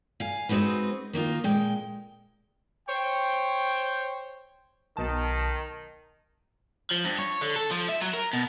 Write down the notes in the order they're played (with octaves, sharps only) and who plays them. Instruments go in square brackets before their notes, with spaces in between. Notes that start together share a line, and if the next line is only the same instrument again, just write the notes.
[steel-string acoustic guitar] F5 G#5
G#3 C4 D#4 F#4 B4
D#3 A#3 D#4 F4
A#2 G#3 G5
[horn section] C5 C#5 G5
[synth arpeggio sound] B1 A5 [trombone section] D#3
[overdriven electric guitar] F3
G2
C#5
D3
A4
F3
E5
F#3
A#4
B2